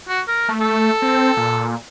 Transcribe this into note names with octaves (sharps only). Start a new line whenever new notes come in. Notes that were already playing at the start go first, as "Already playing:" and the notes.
F#4
A#4
A3
A4
C4
A#2